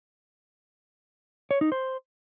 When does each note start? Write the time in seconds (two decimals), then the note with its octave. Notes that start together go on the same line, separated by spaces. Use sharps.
1.51 C#5
1.61 D#4
1.72 C5